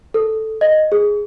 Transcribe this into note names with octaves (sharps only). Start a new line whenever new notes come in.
A4
D#5
G#4